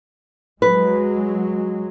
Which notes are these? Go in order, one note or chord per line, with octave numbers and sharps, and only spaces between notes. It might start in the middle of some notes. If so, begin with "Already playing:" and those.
F#3 G#3 B4